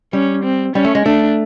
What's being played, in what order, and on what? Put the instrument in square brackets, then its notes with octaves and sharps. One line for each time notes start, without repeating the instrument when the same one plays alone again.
[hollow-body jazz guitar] G3 [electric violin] C#4
[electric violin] C4
[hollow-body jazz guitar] G3 [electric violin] C#4
[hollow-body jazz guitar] A3
G#3
[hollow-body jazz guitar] A3 [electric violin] D4